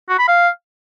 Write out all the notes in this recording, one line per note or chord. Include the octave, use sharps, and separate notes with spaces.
F#4
B5
F5